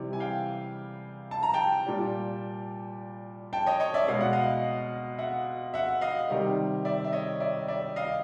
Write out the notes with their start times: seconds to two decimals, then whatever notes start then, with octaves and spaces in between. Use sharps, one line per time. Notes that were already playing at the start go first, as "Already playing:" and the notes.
Already playing: C3 E3 G3
0.13 G#5
0.20 F5 G5
1.31 A5
1.43 A#5
1.54 G5 A5
1.86 A#2 G3
3.53 G5 A5
3.66 C#5 D#5
3.80 C#5 D#5
3.94 D5 E5
4.08 B2 G#3 F5
4.21 F#5
4.33 D#5 F5
5.18 E5 F#5
5.74 E5 F#5
6.01 D#5 F5
6.30 C3 D#3 G3
6.85 D5 E5
7.04 E5
7.13 C#5 D#5
7.40 D5 E5
7.68 D5 E5
7.96 D#5 F5